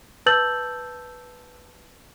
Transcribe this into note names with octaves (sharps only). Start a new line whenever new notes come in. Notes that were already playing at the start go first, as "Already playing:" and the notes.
B4 A5 E6 G6 A6 F#7